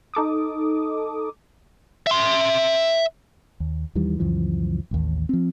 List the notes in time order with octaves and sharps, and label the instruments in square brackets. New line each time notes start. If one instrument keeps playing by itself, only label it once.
[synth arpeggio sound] D#4 A4 D6 D#6
[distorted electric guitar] E5 C6
[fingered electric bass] D#2
D#2 D#3 E3 G3
C#2 F#2 E3 F3
A1 D#2
F3 C4